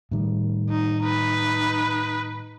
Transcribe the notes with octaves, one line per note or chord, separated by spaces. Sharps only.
A2 D#3 G3
D#4
D#4 B4